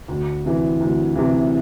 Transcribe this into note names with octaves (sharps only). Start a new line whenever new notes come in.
D2
C3 E3
D2
C3 E3